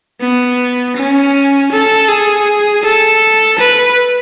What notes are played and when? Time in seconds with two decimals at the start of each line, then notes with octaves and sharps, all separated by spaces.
0.21 B3
0.97 C#4
1.72 A4
2.08 G#4
2.83 A4
3.58 B4